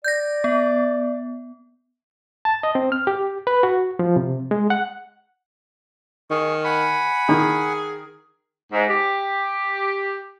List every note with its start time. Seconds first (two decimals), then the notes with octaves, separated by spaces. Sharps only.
0.04 D5 G6 A#6
0.44 B3
2.45 A5
2.63 D#5
2.75 C4
2.92 F6
3.07 G4
3.47 B4
3.63 F#4
3.99 F3
4.16 C3
4.51 G#3
4.70 F#5
6.31 D#3 G#4 C#6
6.65 F#5 G#5 B5
7.29 D#3 G#4
8.72 G#2
8.87 G4